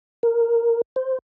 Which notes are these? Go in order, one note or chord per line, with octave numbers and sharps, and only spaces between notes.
A#4
C5